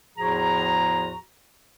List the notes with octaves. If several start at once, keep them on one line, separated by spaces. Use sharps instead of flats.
E2 A2 F3 F#4 G#4 A#5